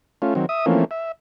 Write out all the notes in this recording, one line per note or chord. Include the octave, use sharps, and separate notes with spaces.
A3 C#4 F4
D#3 F#3 C4
E5 D#6
E3 F3 A3 A#3 C4 C#4
E5